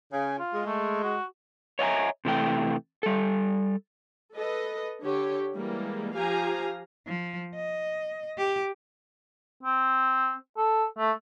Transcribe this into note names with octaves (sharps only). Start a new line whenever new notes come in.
C#3 G#5
F4
G#3
A3
F#4
C#5 D#5 E5 F#5 G#5 A#5
C3 E3 A3 G5
G3 A4
A4 B4 D#5
D3 G4 C#5
E3 G3 G#3 A#3
F3 G4 F5 G#5 A#5
F3
D#5
G4
C4
A4
A3